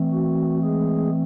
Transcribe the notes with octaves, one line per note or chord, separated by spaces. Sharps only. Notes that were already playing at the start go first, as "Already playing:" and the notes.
Already playing: E3 A3 C4
F#4
G#3 G#4